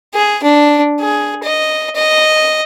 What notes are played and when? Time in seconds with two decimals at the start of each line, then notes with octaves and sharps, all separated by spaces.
0.14 G#4
0.43 D4
1.00 G#4
1.43 D#5
1.96 D#5